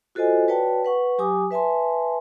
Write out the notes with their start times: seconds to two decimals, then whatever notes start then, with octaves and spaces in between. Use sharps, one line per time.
0.15 F4 F#4 A4 C5 D#5 G#5
0.48 F#4 B4 C#5 D5 G5 A5
0.85 B4 F#5 C#6
1.18 F#3 G4 G#5 D6 D#6
1.51 B4 E5 G#5 A5 C6